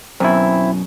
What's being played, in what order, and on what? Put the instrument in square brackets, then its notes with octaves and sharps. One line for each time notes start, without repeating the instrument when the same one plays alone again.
[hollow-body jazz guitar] F#2 B2 [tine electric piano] C4 E4